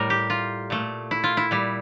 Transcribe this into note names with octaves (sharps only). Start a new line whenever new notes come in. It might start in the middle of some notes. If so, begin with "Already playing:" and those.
Already playing: A2 G3 A#4
G4
F4
A#2 A3
E4
F4
E4
A#2 G3